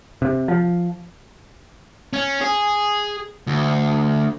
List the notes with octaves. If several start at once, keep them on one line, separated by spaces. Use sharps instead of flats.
C3
F3
C#4
G#4
D2